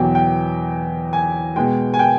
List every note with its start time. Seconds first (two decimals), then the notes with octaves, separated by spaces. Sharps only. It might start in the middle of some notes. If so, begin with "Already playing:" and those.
Already playing: E2 B2 F#3 G5
0.15 G5
1.13 G#5
1.56 B2 G#3 G5
1.94 G#5
1.99 G5